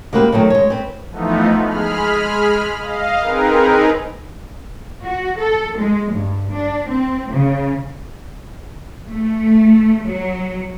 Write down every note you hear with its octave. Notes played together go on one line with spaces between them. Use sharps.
G#3 A#3 F#4 G4 B4
D#3 F#3 A3 C4
G#3 C#5
C4 B4
E3 F3 A3 B3 D#4
G#3 G#4 B5 F6
D#5 F5
C4 D#4 G#4 A#4 B4
F#4
A4
G#3
G2
D4
C4
C#3
A3
F#3